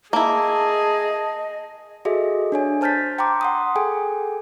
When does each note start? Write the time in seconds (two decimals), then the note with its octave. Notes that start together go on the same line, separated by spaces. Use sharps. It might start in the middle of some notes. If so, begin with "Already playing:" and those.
0.13 A#3 E4 G#4 D#5 A5
2.05 F#4 G#4 A4 D#5 E5
2.52 D4 C#5 G#5
2.81 C5 A5 F6 G6 A6 B6
3.19 G5 A#5 C6 D6
3.41 F#5 C6 D#6
3.76 G#4 A4 G5 G#5